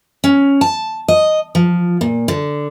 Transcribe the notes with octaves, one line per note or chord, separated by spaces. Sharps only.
C#4
A5
D#5
F3
A#2
D3